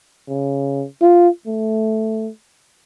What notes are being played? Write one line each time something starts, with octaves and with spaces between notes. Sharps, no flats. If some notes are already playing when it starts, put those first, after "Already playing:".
C#3
F4
A3